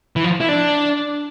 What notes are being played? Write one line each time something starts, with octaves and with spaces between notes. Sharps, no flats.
E3
F3
E4
D4